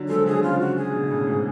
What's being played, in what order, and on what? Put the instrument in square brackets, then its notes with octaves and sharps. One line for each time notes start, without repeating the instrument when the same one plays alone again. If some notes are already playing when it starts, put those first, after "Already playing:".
Already playing: [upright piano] D3 F#3
[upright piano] F3 G#3 [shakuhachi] A4
[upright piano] D3 F#3 [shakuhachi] G#4
[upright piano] C#3 F3 [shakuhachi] F4
[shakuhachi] F#4
G#4
[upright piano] B2 D3
D3
A2 C#3
G#2 B2